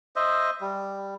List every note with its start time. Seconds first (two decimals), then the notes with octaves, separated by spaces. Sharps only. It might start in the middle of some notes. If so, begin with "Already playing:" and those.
0.16 C5 D#5 E5
0.61 G3